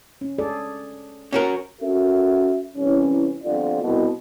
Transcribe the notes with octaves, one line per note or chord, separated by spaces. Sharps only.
C#4
G#4 A4 D5
C#4 F#4 A#4
C#4 F#4 A4 A#4 E5
C2 E3 C#4
G1 F2 D3 F4 D5
C2 B2